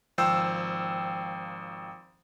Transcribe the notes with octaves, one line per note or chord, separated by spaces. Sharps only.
G#1 F3 C5 G5 E6